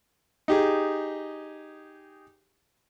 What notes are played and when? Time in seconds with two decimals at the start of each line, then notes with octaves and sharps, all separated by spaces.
0.48 D#4 G4 G#4